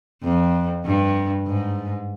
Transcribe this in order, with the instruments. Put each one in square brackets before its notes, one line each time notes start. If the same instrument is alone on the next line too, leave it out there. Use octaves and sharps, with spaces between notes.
[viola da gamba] F2
G2
G#2